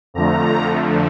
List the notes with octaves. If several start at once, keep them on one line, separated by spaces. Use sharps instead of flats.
F2 D3 F3 A3 A#5